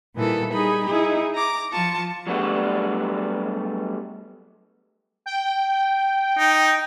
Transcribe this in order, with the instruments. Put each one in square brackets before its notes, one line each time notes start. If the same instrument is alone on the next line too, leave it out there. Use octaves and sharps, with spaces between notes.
[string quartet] A#2 D#3 E3 G3 A4
G3 D#4 G#4 B5
D#4 E4 G#4
A#5 D6
F3 F4 A5 C#6
[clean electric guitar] F#3 G3 A3 B3 D4 F#4
[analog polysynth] G5
[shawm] D#4